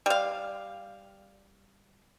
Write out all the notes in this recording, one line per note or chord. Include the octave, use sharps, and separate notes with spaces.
G3 F5